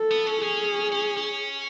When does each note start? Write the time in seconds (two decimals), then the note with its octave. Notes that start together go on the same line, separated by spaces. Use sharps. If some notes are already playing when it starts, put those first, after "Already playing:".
Already playing: A4
0.11 B3
0.27 C#4
0.43 C#4 G#4
0.92 C#4
1.17 C#4